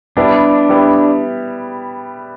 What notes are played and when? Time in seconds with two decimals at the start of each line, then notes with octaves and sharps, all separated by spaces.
0.17 G3 B3 D4 E4 G4
0.69 G3 B3 E4 G4